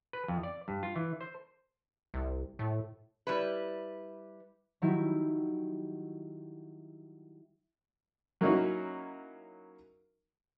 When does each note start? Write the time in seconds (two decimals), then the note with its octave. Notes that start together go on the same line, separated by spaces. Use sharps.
0.13 B4
0.28 F2
0.43 D5
0.68 G2
0.83 F4
0.96 E3
1.21 C5
2.14 C2
2.59 A2
3.27 G3 E4 B4
4.82 D#3 F#3 G3 E4
8.41 F#3 A#3 C#4 D#4 E4 F#4